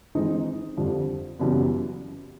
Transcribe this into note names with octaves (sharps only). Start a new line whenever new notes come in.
E3 G#3 C4 D#4
F2 D3 G3
F#2 C#3 E3 G3 B3